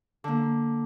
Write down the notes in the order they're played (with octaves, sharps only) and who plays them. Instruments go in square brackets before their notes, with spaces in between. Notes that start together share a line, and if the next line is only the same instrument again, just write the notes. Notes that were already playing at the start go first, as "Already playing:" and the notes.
[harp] D3 A#3